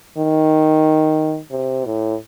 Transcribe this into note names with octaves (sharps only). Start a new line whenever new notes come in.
D#3
C3
A2